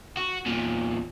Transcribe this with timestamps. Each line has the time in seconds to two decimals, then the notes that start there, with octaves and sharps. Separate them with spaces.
0.17 F#4
0.46 E2 A#2